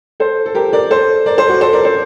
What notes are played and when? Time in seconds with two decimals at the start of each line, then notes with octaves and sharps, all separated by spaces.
0.20 A4 C5
0.46 A4
0.55 G4 A#4
0.73 A#4 D5
0.90 A4 C5
1.26 A#4 D5
1.37 A4 C5
1.49 F#4 A4
1.61 A4 C5
1.73 A#4 D5
1.84 A4 C5